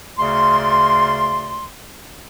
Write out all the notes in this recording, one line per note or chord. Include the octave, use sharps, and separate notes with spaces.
D2 C#3 D5 C6